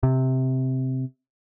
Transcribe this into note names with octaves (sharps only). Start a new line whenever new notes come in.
C3